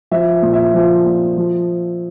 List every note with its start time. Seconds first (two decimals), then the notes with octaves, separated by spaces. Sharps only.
0.11 F3 E5
0.42 A#2
0.53 E5
0.74 F3
1.06 A#2
1.37 F3